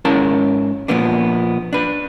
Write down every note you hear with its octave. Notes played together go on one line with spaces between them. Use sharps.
G#2 C#4 E4 A#4 F5 A5
A#2 D#3 F3 A#3 B3 D4
D4 B4